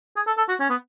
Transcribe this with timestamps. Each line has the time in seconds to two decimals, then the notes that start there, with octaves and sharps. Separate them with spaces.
0.16 G#4
0.27 A4
0.37 A4
0.48 F#4
0.60 C#4
0.70 B3